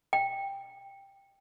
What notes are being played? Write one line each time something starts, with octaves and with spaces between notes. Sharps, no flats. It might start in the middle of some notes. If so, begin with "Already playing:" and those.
G5